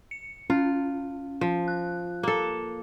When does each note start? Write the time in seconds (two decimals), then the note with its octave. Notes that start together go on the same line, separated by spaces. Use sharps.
0.11 C#7
0.50 C#4 F4
1.41 F3
1.68 F#6
2.23 A#3 A4